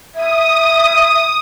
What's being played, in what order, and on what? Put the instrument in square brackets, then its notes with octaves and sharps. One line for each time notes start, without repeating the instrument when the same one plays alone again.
[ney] E5 [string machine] D#6